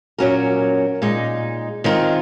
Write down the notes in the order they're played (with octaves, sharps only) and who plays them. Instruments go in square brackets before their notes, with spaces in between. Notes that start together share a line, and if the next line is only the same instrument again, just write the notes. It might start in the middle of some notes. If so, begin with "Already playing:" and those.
[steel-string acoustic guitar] A#2 F#3 C#4 F#4 A#4
A#2 G#3 D#4
D#3 G#3 C4 F4 A#4